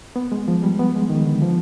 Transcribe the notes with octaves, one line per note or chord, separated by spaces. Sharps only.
B3
G#3
F3
G3
B3
G#3
D#3
D3
F3